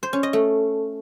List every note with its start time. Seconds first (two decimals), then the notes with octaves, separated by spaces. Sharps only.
0.03 C5
0.13 C#4
0.23 D#5
0.33 A3